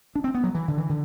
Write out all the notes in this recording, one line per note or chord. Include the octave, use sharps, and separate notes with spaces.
D4
C4
B3
F#3
E3
D3
E3
D3